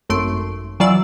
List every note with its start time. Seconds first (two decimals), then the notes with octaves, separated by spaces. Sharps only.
0.10 G#1 F#2 A3 C6 D7
0.80 E3 F#3 F4 D5 C#6 E6